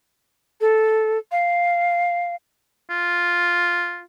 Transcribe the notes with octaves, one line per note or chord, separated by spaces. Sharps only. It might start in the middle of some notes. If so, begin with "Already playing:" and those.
A4
F5
F4